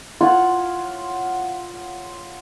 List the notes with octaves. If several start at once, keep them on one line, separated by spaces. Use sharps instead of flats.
F4 C#5 F#5